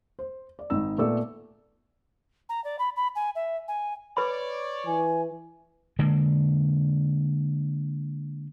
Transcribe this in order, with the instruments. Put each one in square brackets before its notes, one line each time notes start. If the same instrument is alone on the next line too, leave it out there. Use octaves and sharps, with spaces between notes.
[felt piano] C5
D5
G#1 D#4 E6
A#2 A3 B3 A4 D5 E6
[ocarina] A#5
D5
B5
B5
G#5
E5
G#5
[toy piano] B4 B5 [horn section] C#5 D5
[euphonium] E3 [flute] G#5
[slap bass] D3 G#3 A#3